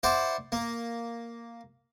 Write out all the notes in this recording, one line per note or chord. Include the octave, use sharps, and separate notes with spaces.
E4 C5 D5 F#5
A#3